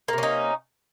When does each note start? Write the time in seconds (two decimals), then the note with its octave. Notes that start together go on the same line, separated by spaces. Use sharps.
0.08 A#3
0.13 C3
0.18 C#4
0.23 D#4